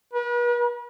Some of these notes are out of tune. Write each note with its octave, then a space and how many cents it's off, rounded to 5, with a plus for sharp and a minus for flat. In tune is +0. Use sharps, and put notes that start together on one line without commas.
B4 -40